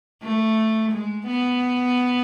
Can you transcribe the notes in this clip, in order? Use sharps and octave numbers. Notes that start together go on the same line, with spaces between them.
A3
G#3
B3